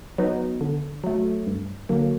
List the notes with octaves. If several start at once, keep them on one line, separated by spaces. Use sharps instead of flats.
F#3 B3 D#4
D3
F#3 A3
G2
D3 F#3 A#3